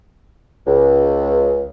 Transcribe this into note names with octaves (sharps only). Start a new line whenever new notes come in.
C#2